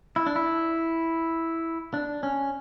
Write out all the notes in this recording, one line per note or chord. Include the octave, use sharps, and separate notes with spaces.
E4
D4
E4
D4
C#4